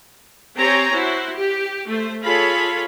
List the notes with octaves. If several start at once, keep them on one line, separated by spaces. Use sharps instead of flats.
C4 G4 C5 C#5 G#5 A#5
E4 F#4 C5
G4
A3 C5
F4 G#4 A4 C#5 F5 B5